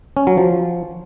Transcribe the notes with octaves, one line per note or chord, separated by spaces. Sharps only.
C#4
F#3
F3